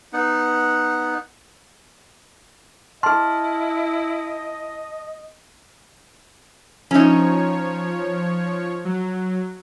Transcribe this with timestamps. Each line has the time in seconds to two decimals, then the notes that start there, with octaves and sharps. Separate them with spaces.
0.13 B3 D#4 F#5
3.03 E4 G#4 D#5 A5 C6 F6
6.91 F3 C#4 D#4 C#5
8.85 F#3